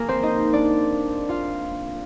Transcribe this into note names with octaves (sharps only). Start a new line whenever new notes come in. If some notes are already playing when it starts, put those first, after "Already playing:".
Already playing: A#3 G#4 A#4
C4 C5
D#4 D#5
D4 D5
F4 F5